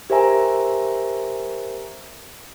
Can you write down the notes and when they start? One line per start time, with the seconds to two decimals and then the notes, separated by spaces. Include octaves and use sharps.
0.10 G4 A#4 C5 E5 G#5 A#5